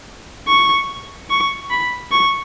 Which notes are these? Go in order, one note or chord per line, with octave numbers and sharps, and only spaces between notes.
C#6
C#6
B5
C#6